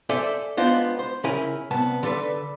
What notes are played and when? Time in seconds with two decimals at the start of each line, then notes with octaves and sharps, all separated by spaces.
0.09 A4 C5 D5 E5 G#5
0.57 G#3 B3 D4 F4 C5 D#5
0.99 C5
1.24 C#3 C#4 E4 A#4 G#5
1.71 C2 B3 A5
2.03 D3 D4 A4 B4